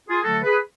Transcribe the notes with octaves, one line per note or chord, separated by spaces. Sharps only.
F4 G#4
D3 F#3 A3 F#4 A4
G#4 B4